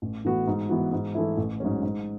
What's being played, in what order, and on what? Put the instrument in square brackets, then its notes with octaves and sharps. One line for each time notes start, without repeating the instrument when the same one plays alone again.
[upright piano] A1
A2 E3 B3 F#4
G#2
E3 B3 F#4
G#2
E3 A3 E4
A1
G#2 F#3 C#4
G#2